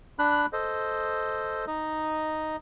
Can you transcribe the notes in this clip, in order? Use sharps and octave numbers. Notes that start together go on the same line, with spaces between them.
D4 B5 F#6
A4 C5 D#5
D#4 D#5